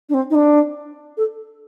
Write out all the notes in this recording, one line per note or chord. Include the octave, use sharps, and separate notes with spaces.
D4
C4
D#4
D4
A4